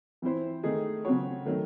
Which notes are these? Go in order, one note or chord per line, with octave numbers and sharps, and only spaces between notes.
E3 C4 E4 C5
D#3 A3 D#4 G#4
C#3 F#3 C4 F#4 C#5
D#3 F#3 A3